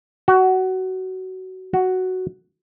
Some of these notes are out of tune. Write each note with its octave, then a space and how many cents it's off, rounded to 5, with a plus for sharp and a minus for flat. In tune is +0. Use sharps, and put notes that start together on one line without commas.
F#4 +20
F#4 +5